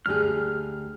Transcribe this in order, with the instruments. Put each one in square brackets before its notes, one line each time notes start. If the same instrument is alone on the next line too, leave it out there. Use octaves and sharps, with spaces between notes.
[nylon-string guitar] D2 G4 G#4 [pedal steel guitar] F6